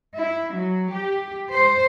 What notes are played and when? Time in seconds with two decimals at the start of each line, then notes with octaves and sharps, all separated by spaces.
0.16 E4
0.56 F#3
0.94 G4
1.53 C5